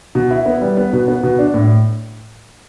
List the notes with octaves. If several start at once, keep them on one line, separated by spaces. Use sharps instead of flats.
B2
E4
B3
G3
B3
B2
B3
B2
D4
A2